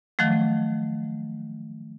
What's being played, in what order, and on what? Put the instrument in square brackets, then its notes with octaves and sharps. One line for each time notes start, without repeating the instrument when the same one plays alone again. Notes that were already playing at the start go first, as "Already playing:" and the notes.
[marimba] D#3 F3 F#3 A3